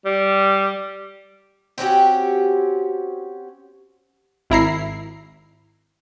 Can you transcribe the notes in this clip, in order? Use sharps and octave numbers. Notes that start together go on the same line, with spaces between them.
G3
C4 C#4 F#4 G4
G#1 E4 A#5 C7